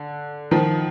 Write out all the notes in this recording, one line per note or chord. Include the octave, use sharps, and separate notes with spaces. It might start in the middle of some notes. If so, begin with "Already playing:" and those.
Already playing: D3
D#3 F3